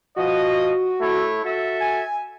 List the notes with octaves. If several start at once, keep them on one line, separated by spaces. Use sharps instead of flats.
F3 F#4 D#5
A3 E4 C#5
F#4 A4 E5
G#5